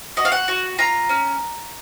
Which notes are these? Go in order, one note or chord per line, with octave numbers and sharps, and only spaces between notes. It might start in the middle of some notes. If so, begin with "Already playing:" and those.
F#4 D#5
F5
F#5
F#4
F4 A#5
C#4